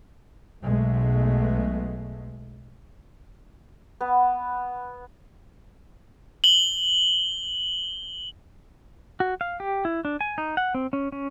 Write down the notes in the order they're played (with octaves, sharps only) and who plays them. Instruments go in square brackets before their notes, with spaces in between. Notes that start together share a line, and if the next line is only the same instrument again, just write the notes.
[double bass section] B1 B2 G#3 A3
[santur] B3
[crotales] F#7 G7
[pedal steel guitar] F#4
F5
G4
E4
D4
G#5
D#4
F#5
C4
C#4
C#4